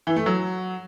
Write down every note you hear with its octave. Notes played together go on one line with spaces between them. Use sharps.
E3
A3
F#3